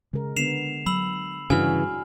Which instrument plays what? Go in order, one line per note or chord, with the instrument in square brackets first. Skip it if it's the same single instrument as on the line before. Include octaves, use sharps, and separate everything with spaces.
[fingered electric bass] C#3 [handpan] G#3 A#4
[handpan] D3 B3 [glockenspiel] C7 E7 F7
[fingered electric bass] F#3 [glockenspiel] B5 E6 F#7
[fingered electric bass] G2 [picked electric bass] C#3 E3 [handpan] D4 F#4 [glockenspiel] G#5 F6